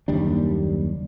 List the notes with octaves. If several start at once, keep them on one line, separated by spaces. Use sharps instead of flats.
F#1 D#2 G3 D4